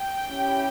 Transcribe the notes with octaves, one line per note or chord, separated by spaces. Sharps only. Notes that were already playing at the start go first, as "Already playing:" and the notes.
Already playing: G5
C#4 E4 G4